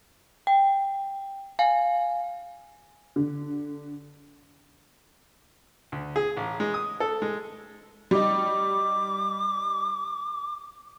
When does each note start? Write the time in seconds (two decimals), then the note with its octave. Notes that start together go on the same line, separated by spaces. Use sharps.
0.47 G5
1.59 F5 G#5
3.16 D3
5.92 D2
6.16 G#4
6.37 A1
6.60 G#3
6.74 D#6
7.00 A4
7.22 G#3
8.11 G3 D#4 D6